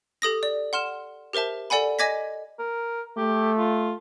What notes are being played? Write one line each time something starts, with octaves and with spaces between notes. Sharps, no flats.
G4 A4 D#6 A#6
D5
F#5 C6 F6 E7
G4 A#4 C5 E5 A5
A4 D5 F#5 G#5 B5
D#5 G#5 D6 G#6 A#6 B6
A#4
A3 G4
F4